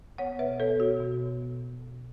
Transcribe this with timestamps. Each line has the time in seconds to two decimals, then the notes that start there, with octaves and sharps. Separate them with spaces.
0.18 B3 C#5 F#5
0.39 B2 B4 E5
0.60 B3 A4 C#5
0.80 B2 F#4
1.00 B2
1.21 B3
1.42 B2
1.61 B2
1.83 B2